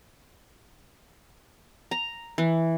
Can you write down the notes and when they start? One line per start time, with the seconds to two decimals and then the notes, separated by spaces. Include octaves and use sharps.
1.91 A#5
2.38 E3